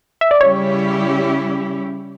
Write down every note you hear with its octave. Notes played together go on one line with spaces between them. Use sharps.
E5
D5
C#3 G3 C#4 E4 G4 C#5